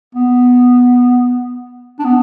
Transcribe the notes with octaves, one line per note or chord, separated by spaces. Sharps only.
B3
D4
B3